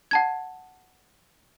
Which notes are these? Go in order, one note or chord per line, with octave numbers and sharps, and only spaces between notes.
F#5 A5 G#6